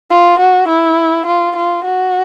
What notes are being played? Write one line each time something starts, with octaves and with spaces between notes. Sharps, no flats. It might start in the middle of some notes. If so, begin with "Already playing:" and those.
F4
F#4
E4
F4
F4
F#4